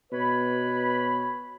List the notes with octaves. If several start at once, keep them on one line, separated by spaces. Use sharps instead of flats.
B2 B4 C#5 B5